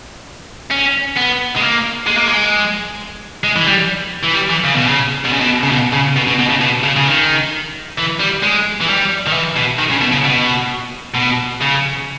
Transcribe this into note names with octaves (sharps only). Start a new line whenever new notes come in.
C#4
B3
G#3
A#3
G#3
A#3
G#3
G#3
E3
G3
E3
G3
E3
C#3
B2
C#3
B2
C#3
B2
C#3
B2
C#3
B2
B2
B2
C#3
B2
C#3
C#3
D#3
E3
G3
G#3
E3
G3
D#3
E3
B2
D#3
C#3
B2
C#3
B2
B2
C#3